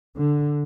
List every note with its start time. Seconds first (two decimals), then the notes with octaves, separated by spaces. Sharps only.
0.16 D3